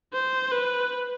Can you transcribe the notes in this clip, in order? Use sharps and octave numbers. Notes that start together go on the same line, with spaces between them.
C5
B4